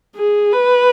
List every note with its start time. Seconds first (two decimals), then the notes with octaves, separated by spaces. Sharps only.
0.16 G#4
0.53 B4